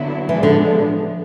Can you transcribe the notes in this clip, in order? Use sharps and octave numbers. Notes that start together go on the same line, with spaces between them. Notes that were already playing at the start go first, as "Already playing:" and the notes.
Already playing: D3 F#3 B3 E4
A2 E3 F3 G#3 B3 D4
D3